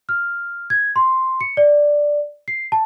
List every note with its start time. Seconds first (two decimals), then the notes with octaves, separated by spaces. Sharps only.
0.09 F6
0.70 G#6
0.96 C6
1.41 C#7
1.57 D5
2.48 C7
2.72 A5